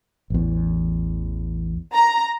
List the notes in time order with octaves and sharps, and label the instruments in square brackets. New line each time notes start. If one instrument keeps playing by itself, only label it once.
[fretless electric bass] A1 E2
[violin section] A#5